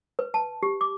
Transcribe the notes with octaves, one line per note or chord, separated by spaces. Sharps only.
B4
A5
G4
D6